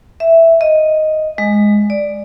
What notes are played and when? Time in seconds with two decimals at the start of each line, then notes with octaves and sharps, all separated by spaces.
0.20 E5
0.61 D#5
1.38 G#3
1.90 D5